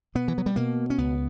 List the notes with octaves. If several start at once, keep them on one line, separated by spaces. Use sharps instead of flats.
B2 B3
E3
F#3
G3
B2 A#3
C#4
C#2 B3